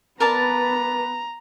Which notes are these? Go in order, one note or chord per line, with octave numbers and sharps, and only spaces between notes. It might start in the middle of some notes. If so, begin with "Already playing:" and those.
B3 A#4 B4 D5 A5 A#5